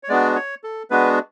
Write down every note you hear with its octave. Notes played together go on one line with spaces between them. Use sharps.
C#5
G#3 B3 D4 F#4 D5
C#5
A4
G#3 B3 D4 F#4 B4